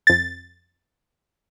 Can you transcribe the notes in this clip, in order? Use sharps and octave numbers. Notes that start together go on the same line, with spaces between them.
F2 A6